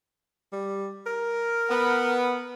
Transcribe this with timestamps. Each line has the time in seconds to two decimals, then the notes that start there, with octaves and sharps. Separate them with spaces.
0.52 G3
1.06 A#4
1.70 B3